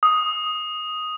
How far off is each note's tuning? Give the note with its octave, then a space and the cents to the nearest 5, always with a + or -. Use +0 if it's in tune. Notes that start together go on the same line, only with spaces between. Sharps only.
D#6 +5